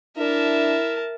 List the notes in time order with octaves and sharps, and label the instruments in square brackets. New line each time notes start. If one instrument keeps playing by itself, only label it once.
[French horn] D4 [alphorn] E4 [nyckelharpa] A#4 A5 [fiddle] E5